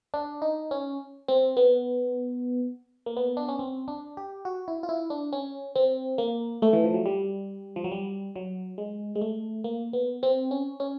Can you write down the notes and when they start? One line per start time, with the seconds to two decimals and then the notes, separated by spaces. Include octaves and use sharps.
0.14 D4
0.42 D#4
0.71 C#4
1.28 C4
1.57 B3
3.06 A#3
3.17 B3
3.37 D4
3.49 C#4
3.59 C4
3.88 D4
4.17 G4
4.45 F#4
4.68 E4
4.83 F4
4.89 E4
5.10 D4
5.33 C#4
5.76 C4
6.18 A#3
6.62 A3
6.73 E3
6.84 F3
6.94 F#3
7.06 G3
7.76 F3
7.84 F#3
7.92 G3
8.36 F#3
8.78 G#3
9.15 G#3
9.22 A3
9.64 A#3
9.93 B3
10.23 C4
10.51 C#4
10.80 C#4